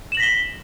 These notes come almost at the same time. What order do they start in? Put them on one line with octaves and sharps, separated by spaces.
E7 F#7 A#6 B6 G7